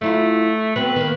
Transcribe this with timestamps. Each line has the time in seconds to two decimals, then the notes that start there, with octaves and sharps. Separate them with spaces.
0.01 F#3 A3 E4 F4
0.76 F#3 B3 C4 B4
0.96 D#3 A#3